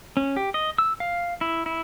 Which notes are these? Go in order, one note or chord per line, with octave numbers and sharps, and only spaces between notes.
C#4
G4
D#5
E6
F5
E4
E4